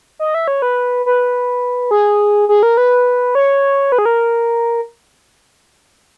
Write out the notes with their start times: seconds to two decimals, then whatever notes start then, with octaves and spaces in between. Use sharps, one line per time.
0.19 D#5
0.34 E5
0.48 C#5
0.62 B4
1.06 B4
1.91 G#4
2.49 G#4
2.63 A#4
2.77 B4
3.35 C#5
3.92 B4
3.98 G#4
4.05 A#4